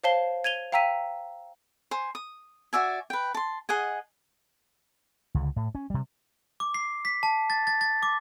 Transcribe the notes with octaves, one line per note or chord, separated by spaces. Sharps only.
C5 C#5 F5 A5 C7 G7
G#6 D#7 F7 G7
F5 G5 A#5 E6 B6 D#7
C5 G#5
D#6
F#4 D5 E5 G#5
B4 G5
A5 C6
G#4 D#5 F#5 G#5
C#2 D3
A2
C#4
C3 G3
D6
C7
B6
A5
A6
A6
A6
D6